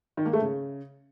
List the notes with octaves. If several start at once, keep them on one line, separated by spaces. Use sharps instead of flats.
D#3
A#3
A3
C#3